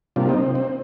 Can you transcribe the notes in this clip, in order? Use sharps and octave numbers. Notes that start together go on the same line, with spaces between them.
C3 G3 A#3 D4 F4
C4 D#4
C4
C4